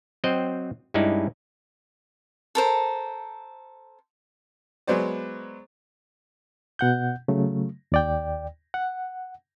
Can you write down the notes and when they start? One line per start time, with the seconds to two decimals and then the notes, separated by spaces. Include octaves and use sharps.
0.24 F#3 C4 C5 D#5 G5
0.94 G2 G#3 C#4 D#4 E4 D5
2.55 A4 A#4 C5
4.87 F#3 G#3 B3 C5 D5
6.79 B2 F#5 G6
7.28 C#3 F#3 A3
7.92 D#2 D5 G5
8.74 F#5